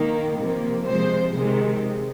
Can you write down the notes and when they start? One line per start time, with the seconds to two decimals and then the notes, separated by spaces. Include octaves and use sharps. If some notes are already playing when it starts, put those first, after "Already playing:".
Already playing: D#3 A#3
0.37 C3 F3 A#3
0.86 C3 F3 G#3 C5
1.35 C3 D#3 G#3